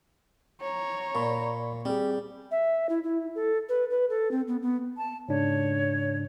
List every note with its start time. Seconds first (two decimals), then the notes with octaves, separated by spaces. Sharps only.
0.61 C#5 A#5
1.15 A#2 D5 B5 C#6
1.85 G3 C4 G4 G#4
2.51 E5
2.89 E4
3.04 E4
3.35 A4
3.69 B4
3.90 B4
4.10 A4
4.31 C4
4.48 B3
4.62 B3
4.97 A5
5.29 G#2 C#3 D4 C#5